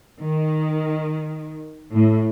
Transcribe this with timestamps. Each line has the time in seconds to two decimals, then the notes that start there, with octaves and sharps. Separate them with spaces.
0.21 D#3
1.94 A2